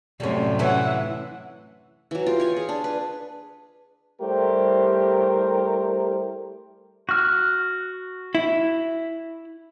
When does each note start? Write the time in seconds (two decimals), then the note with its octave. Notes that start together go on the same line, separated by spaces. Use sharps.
0.20 F#2 A2 C3 G3 C#4
0.59 E3 C#4 E5 F#5
2.11 E3 F#3
2.26 F4 G4
2.40 C#5 G#5
2.56 G#4
2.69 D4
2.84 B4
4.21 G3 A3 E4 G4 A#4 C5
7.09 F#4 F6 F#6
8.35 E4